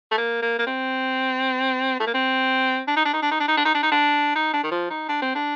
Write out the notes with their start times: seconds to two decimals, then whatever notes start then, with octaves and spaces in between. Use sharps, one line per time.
0.11 A3
0.17 A#3
0.42 A#3
0.58 A#3
0.66 C4
1.99 A3
2.06 A#3
2.14 C4
2.87 D4
2.96 D#4
3.05 D4
3.13 D#4
3.22 D4
3.31 D#4
3.40 D4
3.48 D#4
3.57 D4
3.65 D#4
3.74 D4
3.82 D#4
3.91 D4
4.35 D#4
4.53 D4
4.63 D#3
4.71 F3
4.90 D#4
5.08 D4
5.22 C4
5.35 D4